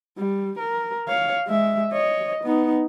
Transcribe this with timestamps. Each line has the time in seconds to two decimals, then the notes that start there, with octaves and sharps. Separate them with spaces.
0.18 G3
0.59 A#4
1.08 C#5 F5
1.48 G#3 E5
1.93 C#5 D#5
2.44 B3 D#4